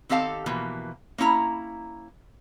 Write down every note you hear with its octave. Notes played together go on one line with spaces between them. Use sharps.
D#3 C4 G4 A4 F5 A5
B2 E3 F3 A#3
A#3 C#4 E4 A#5